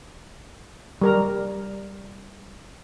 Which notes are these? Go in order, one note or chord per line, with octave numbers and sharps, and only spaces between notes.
G3 A#4 A#5